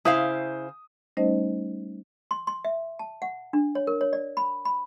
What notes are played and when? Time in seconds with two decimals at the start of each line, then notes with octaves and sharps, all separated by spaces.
0.05 C#3 E4 C5 F5 D#6
1.17 G3 A3 C#4 D#4 C5 D#5
2.31 C6
2.47 C6
2.65 E5
2.99 A5
3.22 F#5
3.53 D4
3.75 C#5
3.87 A#4
4.01 C#5
4.13 D5
4.37 B5
4.65 B5